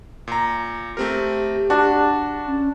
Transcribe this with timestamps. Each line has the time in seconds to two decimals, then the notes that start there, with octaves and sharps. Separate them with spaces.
0.27 A#2 A#5
0.97 A3 C4 G4 A#4
1.70 D4 F#4
2.47 C#4